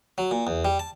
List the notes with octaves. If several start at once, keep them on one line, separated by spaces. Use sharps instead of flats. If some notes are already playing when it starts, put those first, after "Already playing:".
F#3
A#2
E2
G3
A5